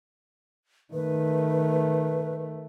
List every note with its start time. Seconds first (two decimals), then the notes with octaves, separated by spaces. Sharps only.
0.94 D#3 A3 B4